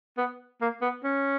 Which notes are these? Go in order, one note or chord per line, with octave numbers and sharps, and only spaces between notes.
B3
A#3
B3
C#4